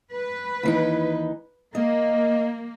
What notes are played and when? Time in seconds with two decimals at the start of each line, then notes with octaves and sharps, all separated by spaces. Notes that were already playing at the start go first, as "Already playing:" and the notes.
0.13 B4
0.63 D#2 E3 D#4
1.75 A#3 D#5